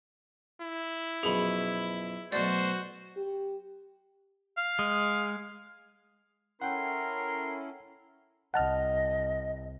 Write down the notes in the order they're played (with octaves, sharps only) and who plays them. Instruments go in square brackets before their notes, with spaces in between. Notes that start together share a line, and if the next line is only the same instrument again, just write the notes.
[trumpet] E4
[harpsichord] F#2 B2 F3 [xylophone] G#4 B5
[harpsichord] B1 A3 [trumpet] F#4 [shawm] C5 [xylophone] D5
[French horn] G4
[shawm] F5
[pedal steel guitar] G#3
[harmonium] C#4 E4 A4 [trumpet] A#4 [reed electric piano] F#5 G5 [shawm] C6
[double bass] C2 [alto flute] D#5 [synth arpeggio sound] F#5 A5 F6